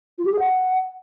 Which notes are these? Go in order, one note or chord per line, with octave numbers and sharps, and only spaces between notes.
F4
G4
G#4
F#5